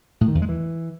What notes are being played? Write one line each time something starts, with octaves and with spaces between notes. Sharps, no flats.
A2
D#3
E2
G#3
E3